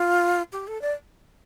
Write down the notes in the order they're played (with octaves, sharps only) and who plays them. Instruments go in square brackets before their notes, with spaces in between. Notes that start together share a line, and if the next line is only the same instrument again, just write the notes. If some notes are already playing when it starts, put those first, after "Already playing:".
Already playing: [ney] F4
G4
A4
D5